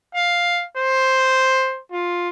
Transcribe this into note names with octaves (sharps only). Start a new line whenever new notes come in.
F5
C5
F4